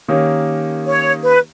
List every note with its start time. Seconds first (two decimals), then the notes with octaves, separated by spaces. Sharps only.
0.08 D#3 A#3 C#4 G4
0.85 C#5
1.24 B4